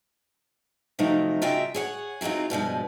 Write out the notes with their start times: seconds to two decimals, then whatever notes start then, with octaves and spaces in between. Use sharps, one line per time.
0.99 C3 D#3 F3 F#3 A3 D#4
1.42 C#3 F#3 F4 D#5 E5 G5
1.74 G#4 C#5 F#5
2.21 E3 F#3 C4 D#4 F4
2.50 G2 B2 F3 G#3